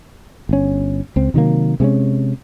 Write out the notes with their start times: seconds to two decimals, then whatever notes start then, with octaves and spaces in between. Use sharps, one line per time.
0.49 G1 C#4
1.16 C#2 C4
1.34 C3 D#3 F#3 A#3
1.80 C3 G#3 B3 C#4